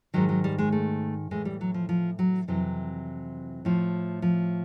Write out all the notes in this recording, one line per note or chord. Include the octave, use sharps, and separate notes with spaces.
G#2 D#3 F#3
F#3
G3
G#3
A3
A2 E3 G#3
G3
F#3
F3
F3
F#3
F2 C3 E3 F#3
A2 F3
F3